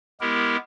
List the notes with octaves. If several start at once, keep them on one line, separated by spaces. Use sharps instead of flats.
G#3 B3 E4 G4 A#4